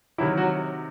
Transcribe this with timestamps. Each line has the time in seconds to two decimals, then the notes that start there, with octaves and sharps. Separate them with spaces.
0.18 C3 D#3 E3 F#3 E4
0.37 F#3 F#4